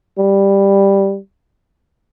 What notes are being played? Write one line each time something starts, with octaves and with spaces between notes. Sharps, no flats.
G3